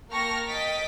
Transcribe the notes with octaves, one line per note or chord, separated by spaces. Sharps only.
A#3 G5 A5 C#6 F6 A#6
D#5 G5 A6 B6 D7